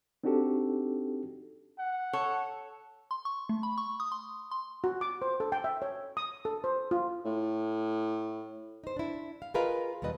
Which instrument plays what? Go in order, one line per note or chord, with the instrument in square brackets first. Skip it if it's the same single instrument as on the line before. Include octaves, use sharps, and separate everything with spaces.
[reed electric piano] C4 D4 D#4 F#4 G4 A4
[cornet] F#5
[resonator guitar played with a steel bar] A4 C#5
[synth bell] C6
C#6
A3
B5
C#6
D#6
C6
C6
[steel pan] F#4
D6
C5
A4
G5
E5
C#5
D#6
A4
C5
F4
[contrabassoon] A2
[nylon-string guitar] D#4 C5
D4 E4
F5
F4 G#4 A#4 B4 D#5 F5
D#2 B2 G3 B4 D#5